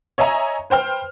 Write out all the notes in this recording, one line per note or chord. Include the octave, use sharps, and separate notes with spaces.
C#5 D#5 E5 G#5 A#5
B4 C5 G5 F6